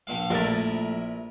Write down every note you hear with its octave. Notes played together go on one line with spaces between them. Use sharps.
A#1 A#2 F5
A#1 F3 A3 E4 A#4 A6